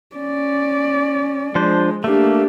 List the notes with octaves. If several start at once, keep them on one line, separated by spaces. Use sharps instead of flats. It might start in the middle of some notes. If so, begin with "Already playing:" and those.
C#4 D5
F3 G#3 D4 C5
A3 A#3 D4 G4